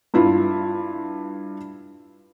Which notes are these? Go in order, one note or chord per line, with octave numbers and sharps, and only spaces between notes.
G2 E4 F4